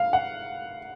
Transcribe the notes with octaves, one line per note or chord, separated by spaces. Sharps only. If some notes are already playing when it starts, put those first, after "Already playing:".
Already playing: F5
F#5